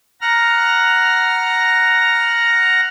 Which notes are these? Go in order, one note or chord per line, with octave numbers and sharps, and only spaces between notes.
F#5 A#5 F6